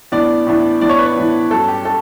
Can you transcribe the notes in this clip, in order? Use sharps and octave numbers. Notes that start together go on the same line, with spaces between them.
A2 E3 B3 D4 D5
A2 E3 B3 D4
A2 E3 B3 D4 D5
C#5
B4
C#5
A2 E3 B3 D4
G2 F#3 C#4 A4
G4
A4